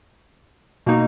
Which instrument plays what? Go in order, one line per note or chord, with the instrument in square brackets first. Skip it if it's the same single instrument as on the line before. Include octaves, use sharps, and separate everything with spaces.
[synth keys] B2 A#3 D#4